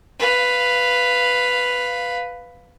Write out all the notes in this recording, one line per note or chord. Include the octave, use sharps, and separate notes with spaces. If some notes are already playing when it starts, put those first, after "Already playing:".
B4 F5